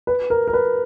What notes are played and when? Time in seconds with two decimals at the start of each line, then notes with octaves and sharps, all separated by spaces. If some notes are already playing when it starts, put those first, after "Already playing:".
0.07 B4
0.30 A#4
0.48 A#4
0.53 B4